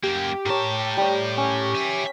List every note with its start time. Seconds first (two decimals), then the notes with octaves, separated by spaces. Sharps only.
0.03 F#2 A#3 G4
0.46 A2 A#4 C#5 A5
0.97 G3 C#5
1.37 C#4
1.74 E5 G#5